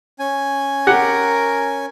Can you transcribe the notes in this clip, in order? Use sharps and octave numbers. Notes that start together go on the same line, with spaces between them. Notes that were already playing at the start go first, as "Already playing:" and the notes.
C#4 G#5
G4 A#4 F#5